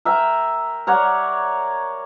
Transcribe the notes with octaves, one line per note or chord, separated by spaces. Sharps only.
A#4 E5 G5 G#5
A#4 C#5 D5 F#5